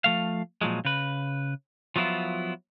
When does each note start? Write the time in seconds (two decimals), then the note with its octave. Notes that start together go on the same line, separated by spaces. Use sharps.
0.04 F3 A3 F5
0.61 A#2 F3 F#3 G#3
0.85 C#3 B4
1.96 F3 F#3 B3 E4 F4